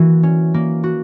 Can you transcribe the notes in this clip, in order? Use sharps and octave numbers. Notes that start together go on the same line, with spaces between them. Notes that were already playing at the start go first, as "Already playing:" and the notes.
Already playing: E3 A#3 F#4
C#4
A#3
F#4